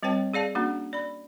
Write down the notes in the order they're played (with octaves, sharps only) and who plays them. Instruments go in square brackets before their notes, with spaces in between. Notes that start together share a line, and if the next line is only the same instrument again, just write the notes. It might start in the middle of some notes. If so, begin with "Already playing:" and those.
[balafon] G3 C4 B4 C#5 G5 A5
G#4 D5 F5 A5
A#3 C#4 D4 F#4
D5 B5